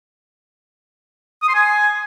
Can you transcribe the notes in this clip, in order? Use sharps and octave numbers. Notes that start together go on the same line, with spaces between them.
D#6
C6
G#5